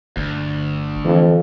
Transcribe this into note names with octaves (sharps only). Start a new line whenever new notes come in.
G1 D2
F2 E3